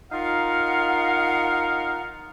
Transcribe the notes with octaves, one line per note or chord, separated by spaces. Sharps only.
D#4 F4 A#4 F5 F#5